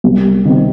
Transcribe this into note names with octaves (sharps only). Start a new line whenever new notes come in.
C2
C3 D#3